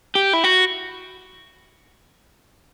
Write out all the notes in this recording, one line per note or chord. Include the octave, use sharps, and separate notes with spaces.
G4
E4
F#4